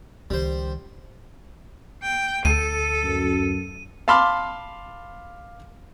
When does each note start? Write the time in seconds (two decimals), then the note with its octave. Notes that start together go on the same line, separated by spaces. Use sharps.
0.30 C#2 D#3 G3 C5
2.03 G5
2.45 D2 A4 D#7
3.03 F#2
4.08 F5 A5 B5 C6 D6 F6